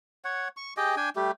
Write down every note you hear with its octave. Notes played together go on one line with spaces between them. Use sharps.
C#5 F#5
C#6
G4 G#4 D#5 G5
D4 G5 G#5
G3 A3 G4